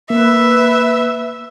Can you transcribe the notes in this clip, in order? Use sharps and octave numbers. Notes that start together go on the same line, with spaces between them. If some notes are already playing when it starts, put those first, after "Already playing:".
A#3 B4 E5